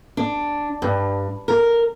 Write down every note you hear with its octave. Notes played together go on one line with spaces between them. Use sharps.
D4
G2
A#4